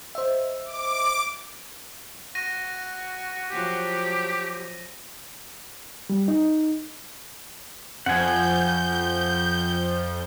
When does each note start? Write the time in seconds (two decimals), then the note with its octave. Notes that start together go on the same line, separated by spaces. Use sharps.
0.15 C5 D#5 E5
0.65 D6
2.35 F#4 A#6 D#7
3.51 F3 F#3 G4
6.10 G3
6.28 D#4
8.06 F2 F3 F#5 G#5 G6